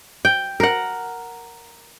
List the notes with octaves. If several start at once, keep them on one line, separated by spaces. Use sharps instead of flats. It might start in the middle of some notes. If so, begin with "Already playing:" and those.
G5
A#4 F#5